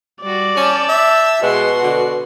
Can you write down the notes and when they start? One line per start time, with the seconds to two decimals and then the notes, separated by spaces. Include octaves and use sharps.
0.22 G3 F#4 D5
0.57 C#4 A5 E6 G6
0.89 E5
1.43 B2 G#3 F#4 F#5 C6
1.84 D3